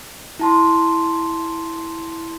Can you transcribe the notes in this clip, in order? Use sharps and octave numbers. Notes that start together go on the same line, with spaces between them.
E4 A5 C6